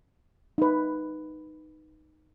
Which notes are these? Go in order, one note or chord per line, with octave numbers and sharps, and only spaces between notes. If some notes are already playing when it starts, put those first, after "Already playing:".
D#4 B4